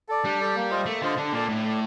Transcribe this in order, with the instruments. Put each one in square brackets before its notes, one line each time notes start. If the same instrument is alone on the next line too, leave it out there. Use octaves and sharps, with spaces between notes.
[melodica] A4 D5
[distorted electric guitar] G3 [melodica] D4
[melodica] A4 D5
A#3
F4 C5 D#5
[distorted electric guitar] A3 [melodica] A#3
[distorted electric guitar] D3 [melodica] F4 C5 D#5
[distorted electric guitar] D3 [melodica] D4
[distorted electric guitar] A#2 [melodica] A4 D5
[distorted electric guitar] A2 [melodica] D4
[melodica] A4 D5